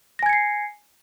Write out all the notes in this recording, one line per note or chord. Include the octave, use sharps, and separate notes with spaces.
G#5 G#6 A#6 C7 C#7